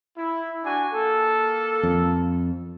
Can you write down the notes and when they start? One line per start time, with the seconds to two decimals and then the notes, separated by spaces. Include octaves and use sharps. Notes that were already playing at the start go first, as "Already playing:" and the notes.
0.18 E4
0.65 D4 F#4 G#5
0.93 A#3 A4
1.83 F2